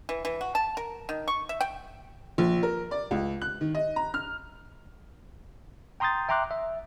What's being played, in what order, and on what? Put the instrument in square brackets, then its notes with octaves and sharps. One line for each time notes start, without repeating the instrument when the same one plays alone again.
[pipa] E3
E3
F#4
A5
A#4
D#3
C#6
E5
G5
[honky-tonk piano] A#1
A#4
D5
C#2
F#6
D#3
D#5
A#5
F6
[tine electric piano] G5 A#5 C6 D#6 G6 A6
E5 G5 A#5 C6 D6 F#6
E5